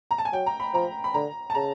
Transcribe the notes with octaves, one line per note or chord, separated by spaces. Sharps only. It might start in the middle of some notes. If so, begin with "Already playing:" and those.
A#5
A5
G#5
F#3 G5
A#5
B5
F3 A#5
B5
D3 A#5
A5
C#3 A#5